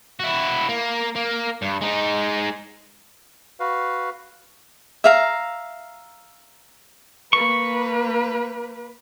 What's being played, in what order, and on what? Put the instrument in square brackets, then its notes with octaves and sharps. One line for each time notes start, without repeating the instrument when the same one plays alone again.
[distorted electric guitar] E4 F#4
A#3
A#3
G2
G#3 D#4
[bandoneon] F#4 B4 F5
[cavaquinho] E5 F5 A#5
[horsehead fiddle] A#3 B4 [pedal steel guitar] C#6